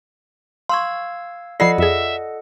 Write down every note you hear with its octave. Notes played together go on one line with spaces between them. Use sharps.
F5 C6 C#6 E6 G#6
F3 F4 A4 D5 D#5 F#5 A#6 C7
F2 G#4 E5